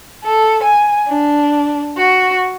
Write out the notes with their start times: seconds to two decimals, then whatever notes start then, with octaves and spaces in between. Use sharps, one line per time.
0.24 A4
0.63 G#5
1.08 D4
1.97 F#4